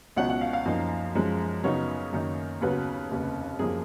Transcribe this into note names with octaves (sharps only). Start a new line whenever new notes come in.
C#2 B2 F#3 C#4 F#5
F#5
F5
F5
F#2 F3 A#3 D#4
F#2 F3 G#3
F#2 C#3 F#3 B3 D#4 C#5
F#2 D#3 A#3 D#4
D#2 C#3 F#3 B3 B4
F1 D#2 C#3
F#2 F3 A#3 G#4